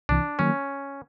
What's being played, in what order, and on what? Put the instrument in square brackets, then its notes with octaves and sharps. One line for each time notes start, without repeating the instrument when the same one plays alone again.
[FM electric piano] C2 C3 E3 [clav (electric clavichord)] D4
[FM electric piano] D#3 F#3 A#3 [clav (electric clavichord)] C#4